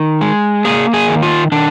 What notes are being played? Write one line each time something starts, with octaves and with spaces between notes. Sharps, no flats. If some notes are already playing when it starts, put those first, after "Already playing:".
Already playing: D#3
G#3
A#3 G#4
G#4
D#3
F4
D#3 D4